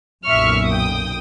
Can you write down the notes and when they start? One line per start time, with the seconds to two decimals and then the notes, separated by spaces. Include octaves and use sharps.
0.25 B1 F#2 A#2 E5 C#6 F6
0.68 G5 D#6